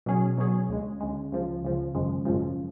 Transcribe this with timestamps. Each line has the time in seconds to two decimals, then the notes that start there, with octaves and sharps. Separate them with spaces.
0.06 B2 F#3 C#4 G#4
0.38 B2 F#3 C#4 G#4
0.69 D2 C#3 G#3
1.00 D2 C#3 G#3
1.32 C#2 C#3 F3
1.63 C#2 C#3 F3
1.94 G#1 F#2 C#3 F3 G#3
2.25 G#1 F#2 C#3 F3 G#3